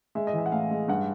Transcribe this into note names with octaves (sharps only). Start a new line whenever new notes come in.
G#3 E5
D#5
E3
E5
F#5
A2 F5
G#3
G2 F#5